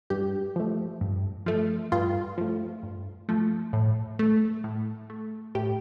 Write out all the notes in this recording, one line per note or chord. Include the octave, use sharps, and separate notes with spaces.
G2 G4
F3 A3
G2
F3 A3
G2 F4
F3 A3
G2
F3 A3
A2
A3
A2
A3
A2 G4